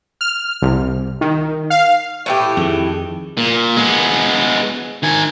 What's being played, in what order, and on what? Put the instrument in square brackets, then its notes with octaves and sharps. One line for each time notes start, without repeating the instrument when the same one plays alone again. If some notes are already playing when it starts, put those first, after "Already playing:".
[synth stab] F6
C2
D#3
F5
[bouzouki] A2 E3 G4 [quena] C#6
[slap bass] F2 D#3 [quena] G#4
[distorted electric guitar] A#2
G#3 B3
D#3 G#5